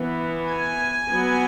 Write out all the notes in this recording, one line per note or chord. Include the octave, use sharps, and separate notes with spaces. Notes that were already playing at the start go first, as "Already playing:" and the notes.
Already playing: E3 B3
G#5
F#3 B3